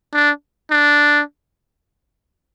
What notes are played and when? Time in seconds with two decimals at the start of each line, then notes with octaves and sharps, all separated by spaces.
0.14 D4
0.71 D4